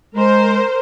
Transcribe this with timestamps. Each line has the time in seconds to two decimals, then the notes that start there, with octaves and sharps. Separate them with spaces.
0.15 G#3 A#4 C5